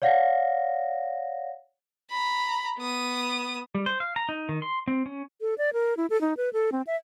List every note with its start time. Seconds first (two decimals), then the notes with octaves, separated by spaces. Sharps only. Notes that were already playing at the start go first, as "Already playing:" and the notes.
0.02 C#5 D5 F5 F#5 A#6
2.10 A#5 B5
2.78 B3 D#6
3.75 G3
3.86 C5
4.00 F5
4.16 A#5
4.29 D#4
4.49 D#3
4.62 C6
4.88 C4
5.06 C#4
5.41 A4
5.58 D5
5.73 A#4
5.97 E4
6.10 A4
6.21 D#4
6.37 B4
6.53 A4
6.72 C4
6.87 E5